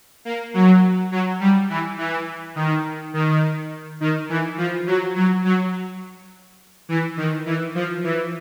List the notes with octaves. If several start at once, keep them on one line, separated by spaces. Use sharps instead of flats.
A#3
F#3
F#3
G3
E3
E3
D#3
D#3
D#3
E3
F3
F#3
F#3
F#3
E3
D#3
E3
F3
E3